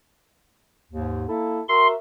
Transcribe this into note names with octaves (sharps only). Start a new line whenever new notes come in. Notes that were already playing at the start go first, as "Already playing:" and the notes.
D#2 G#2
A#3 E4 A4
F#4 A#4 E5 C6